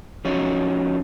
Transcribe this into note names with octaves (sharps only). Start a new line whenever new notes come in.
F3 C#4 D#4 F#4